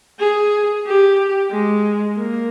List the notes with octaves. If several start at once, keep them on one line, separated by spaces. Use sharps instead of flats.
G#4
G4
G#3
A#3